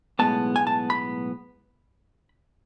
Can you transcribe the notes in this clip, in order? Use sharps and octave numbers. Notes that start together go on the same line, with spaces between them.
B1 A2 G#3 B3 A5
G#5
A5
B5